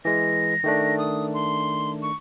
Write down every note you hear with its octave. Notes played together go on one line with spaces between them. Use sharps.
E3 G#3 A#6
D#3 A3 D4
D#6
C6
C#6